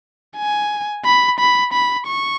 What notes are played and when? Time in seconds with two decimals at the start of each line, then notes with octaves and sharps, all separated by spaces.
0.37 G#5
1.05 B5
1.39 B5
1.73 B5
2.08 C#6